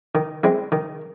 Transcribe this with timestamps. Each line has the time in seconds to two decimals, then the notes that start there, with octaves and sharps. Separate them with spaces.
0.15 D#3
0.44 G#3 C4 E4
0.72 D#3